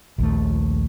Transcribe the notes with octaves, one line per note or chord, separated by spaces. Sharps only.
A#1 D#2 A3